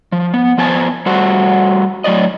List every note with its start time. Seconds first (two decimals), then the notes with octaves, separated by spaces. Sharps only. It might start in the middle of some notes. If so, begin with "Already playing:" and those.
0.12 F3
0.34 B3
0.58 F3 B3 C5 G#5 A5
1.06 G3 A3 F#4 C5 F#5
2.04 A2 F#3 D#4 D5 D#5